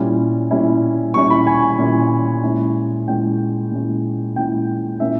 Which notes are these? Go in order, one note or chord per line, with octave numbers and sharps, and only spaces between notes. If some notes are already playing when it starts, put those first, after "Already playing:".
Already playing: A#2 G3 C#4 E4
A#2 G3 C#4 E4
A#2 G3 C#4 E4 C#6
B5
G#5
A#2 G3 C#4 E4
A#2 G#3 C#4 E4
A#2 G#3 C#4 E4 G5
A#2 G#3 C#4 E4
A#2 G#3 C#4 E4 G5
A#2 A#3 C#4 E4 E5